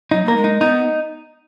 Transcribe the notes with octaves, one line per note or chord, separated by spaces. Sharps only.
F#3 D#4
A#3 A#4
G#3
D#4
B3 D#4